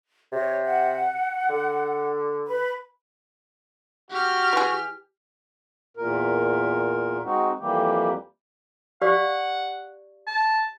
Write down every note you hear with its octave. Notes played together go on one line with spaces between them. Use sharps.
C3 C#5
F#5
D3
B4 B5
F#4 G4 F6
E3 G#4
E2 A#2 A#4
G#3 C4 D#4 F#4
F2 E3 G3 A#3 G4
G4 D5 F5 F#5
A5